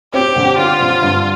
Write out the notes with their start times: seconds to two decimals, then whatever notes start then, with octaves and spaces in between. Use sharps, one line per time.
0.13 C4 G4
0.36 D3
0.58 C4 F4
0.81 D3
1.02 G2